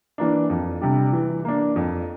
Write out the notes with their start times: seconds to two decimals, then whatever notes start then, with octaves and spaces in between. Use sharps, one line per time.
0.18 E3 A#3 D4
0.50 F2
0.81 C3 G3 D4
1.13 E3
1.45 A#3 D4
1.76 F2